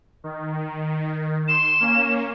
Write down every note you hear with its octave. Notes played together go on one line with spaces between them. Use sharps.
D#3
C6 E7
A#3 C#4